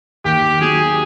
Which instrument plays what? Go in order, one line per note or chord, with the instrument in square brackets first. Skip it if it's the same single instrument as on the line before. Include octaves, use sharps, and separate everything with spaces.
[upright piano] D#2 [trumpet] G4
[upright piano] F#3 [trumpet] G#4